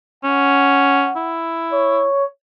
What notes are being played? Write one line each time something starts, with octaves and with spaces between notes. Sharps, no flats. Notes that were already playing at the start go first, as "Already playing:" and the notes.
C#4 F#5
E4
C#5